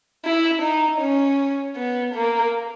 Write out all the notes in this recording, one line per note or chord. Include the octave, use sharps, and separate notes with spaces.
E4
D#4
C#4
B3
A#3